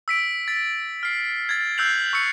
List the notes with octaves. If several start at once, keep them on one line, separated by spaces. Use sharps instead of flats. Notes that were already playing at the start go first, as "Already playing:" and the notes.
E6 B6 D7
A6 B6
F6 C7
G#6 A6
E6 F#6 G6 C7 F7 F#7
C#6 E6 C#7